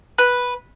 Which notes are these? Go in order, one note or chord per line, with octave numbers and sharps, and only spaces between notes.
B4